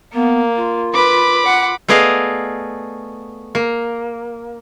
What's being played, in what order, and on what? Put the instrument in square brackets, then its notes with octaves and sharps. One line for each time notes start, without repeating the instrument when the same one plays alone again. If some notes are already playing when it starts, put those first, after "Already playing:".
[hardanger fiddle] A#3 [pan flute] B3
[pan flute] F4
[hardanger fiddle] B4 [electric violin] B5 D6
[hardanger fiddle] F#5
[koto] A3 B3 G#4 D5 D#5 F5
A#3